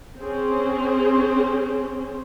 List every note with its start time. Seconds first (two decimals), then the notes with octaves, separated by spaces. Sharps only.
0.18 C4 C#4 G#4 C5